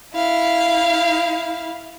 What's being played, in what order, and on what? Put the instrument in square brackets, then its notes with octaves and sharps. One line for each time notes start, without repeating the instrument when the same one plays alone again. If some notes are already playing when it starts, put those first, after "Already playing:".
[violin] E4 F5